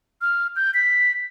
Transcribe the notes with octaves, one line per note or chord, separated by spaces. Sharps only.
F6
G6
B6